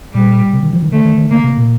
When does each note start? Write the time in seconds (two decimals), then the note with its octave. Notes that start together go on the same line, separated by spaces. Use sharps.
0.14 A#2 G3
0.53 C3
0.63 D#3
0.73 F3
0.82 D#3
0.92 D3 A3
1.05 D#3
1.18 D#3
1.31 D3 A#3
1.44 C3
1.57 A#2